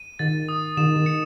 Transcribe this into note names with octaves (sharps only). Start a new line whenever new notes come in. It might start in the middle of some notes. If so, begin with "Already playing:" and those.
Already playing: D#7
D#3 A6
D#6
D#3 E7
D#3
C#7